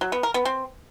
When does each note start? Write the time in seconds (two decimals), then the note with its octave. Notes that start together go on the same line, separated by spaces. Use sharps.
0.01 F#3
0.12 B3
0.23 A#4
0.34 B3
0.45 C4